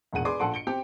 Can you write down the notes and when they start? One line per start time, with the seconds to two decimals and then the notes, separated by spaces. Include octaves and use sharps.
0.13 E1 A#1 G#4 F#5 D#7
0.25 G#4 B4 D5 C6 D6
0.40 A#1 A4 F#5 C6 D7
0.54 C#7 D7 G7
0.67 C4 G4 G5